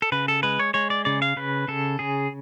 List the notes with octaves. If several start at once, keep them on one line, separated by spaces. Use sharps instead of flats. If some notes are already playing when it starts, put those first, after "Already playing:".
A4
C#3 B4
A4
G#3 B4
C#5
G#3 C#5
D5
C#3 D5
F5
C#3 B4
C#3 A4
C#3 G#4